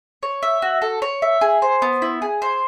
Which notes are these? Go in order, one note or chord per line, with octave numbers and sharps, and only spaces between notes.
C#5
E5
F#4
A4
C#5
E5
G#4
C5
B3
E4
G#4
C5